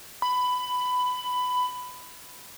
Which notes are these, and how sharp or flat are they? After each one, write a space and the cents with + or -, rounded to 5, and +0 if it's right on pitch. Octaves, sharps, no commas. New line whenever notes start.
B5 +15